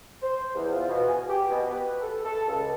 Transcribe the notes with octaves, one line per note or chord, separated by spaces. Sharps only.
C5
E2
F4
B2
G#5
G4
B2
B4
A4
A4
C#2